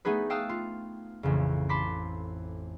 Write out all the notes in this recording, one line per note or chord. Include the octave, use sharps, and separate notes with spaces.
A3 B3 D#4 G#4 B4
F5 G5 A5 D#6 E6 F#6
F4
A1 F2 C#3
A5 B5 C6 D6 B6